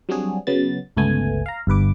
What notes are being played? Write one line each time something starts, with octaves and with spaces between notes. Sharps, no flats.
F#3 G3 C4 D4 F#4 G#4
C#3 F#3 B3 A6
G1 C#2 A3 B3 G#5
F5 A#5
G1 G2 B4 D6